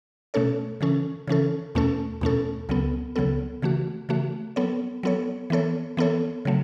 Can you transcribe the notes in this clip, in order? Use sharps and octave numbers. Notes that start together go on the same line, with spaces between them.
B2 A3 C#4 A4 C#5
C#3 E3 C#4 A4
C#3 E3 C#4 A4
E2 B2 A3 C#4 A4
E2 B2 A3 C#4 A4
C#2 C#3 F#3 B3 A4
C#2 C#3 F#3 B3 A4
C#3 E3 A3 F#4
C#3 E3 A3 F#4
F#3 B3 A4 C#5
F#3 B3 A4 C#5
E3 B3 A4 C#5
E3 B3 A4 C#5
C#3 F#3 A3